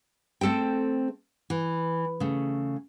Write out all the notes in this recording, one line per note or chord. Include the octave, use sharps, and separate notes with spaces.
A3 C4 A4 C5 G5
E3
C#3 A3